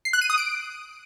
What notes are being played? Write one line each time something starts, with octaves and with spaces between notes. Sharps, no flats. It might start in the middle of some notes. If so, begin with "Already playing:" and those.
C7
F#6
D#7
D#6
D7